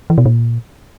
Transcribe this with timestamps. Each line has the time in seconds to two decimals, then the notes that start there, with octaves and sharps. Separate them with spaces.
0.10 E3
0.18 B2
0.26 A#2